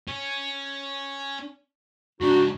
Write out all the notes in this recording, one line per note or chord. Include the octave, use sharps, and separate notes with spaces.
C#4
G#2 C#3 D4 D#4 F#4